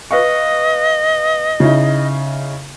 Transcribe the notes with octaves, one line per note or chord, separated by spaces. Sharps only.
B4 D#5 F5 C#6
C#3 D#4 E4